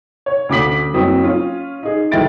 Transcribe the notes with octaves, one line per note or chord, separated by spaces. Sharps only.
C#5
D2 C#4 D6 D#6 B6 F#7
F#1 F#3 C4 D#6
C#4 F4
D#4 G#4
B1 D#3 E4 A6 D7